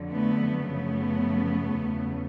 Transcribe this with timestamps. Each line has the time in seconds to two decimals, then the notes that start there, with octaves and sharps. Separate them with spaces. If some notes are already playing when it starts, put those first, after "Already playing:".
Already playing: F2 D3 F#3
0.10 A3 B3
0.62 F#2 C#3 F3 A3 B3
1.66 E2 C#3 F#3